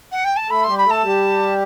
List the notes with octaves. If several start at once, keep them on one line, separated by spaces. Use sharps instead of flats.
F#5
G5
A5
A3 A4 B5
G3 G4 C6
B5
A3 A4 A5
G3 G4